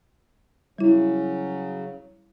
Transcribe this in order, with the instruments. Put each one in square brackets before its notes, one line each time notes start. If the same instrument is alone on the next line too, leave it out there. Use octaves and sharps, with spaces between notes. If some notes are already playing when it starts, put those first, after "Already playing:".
[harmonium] C#3 F#3 [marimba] G3 E4